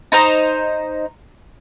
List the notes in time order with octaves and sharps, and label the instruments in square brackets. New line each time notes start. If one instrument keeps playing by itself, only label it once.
[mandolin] D#4 C5 A#5